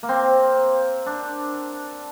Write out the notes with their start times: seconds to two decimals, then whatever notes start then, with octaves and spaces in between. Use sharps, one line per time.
0.03 A#3
0.09 C4
1.06 D4